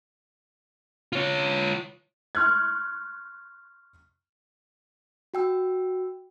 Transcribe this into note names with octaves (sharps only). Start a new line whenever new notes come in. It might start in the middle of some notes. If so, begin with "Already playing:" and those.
F4 C#5
C6 C#6 F6 F#6 G#6
F#4 G5 E6